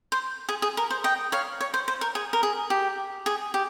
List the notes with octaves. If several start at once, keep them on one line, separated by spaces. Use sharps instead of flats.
C5
G#4
G#4
A#4
C5
D#5 G5
C#5 F5
C#5
C5
C5
A#4
G#4
A#4
G#4
G4
G#4
G4